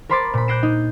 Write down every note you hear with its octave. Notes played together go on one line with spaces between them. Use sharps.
A#4 C5 B5 C6 D6 A6
A#2 B5
F#6 G6 A#6 C7 D7 E7
D#4